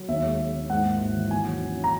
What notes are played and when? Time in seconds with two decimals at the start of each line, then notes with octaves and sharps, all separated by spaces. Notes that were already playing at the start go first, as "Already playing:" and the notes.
Already playing: F#3
0.08 D#2 E5
0.24 G#3
0.39 G#3
0.55 D#2
0.70 G#2 F#5
0.85 A#3
1.00 G#1
1.16 E3
1.31 D#2 G#5
1.46 F#3
1.62 C#4
1.77 C#4
1.84 A#5